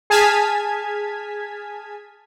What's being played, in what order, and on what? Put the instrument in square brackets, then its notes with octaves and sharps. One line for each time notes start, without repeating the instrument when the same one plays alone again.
[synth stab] G#4 G#5 A5 F6 G#6 B6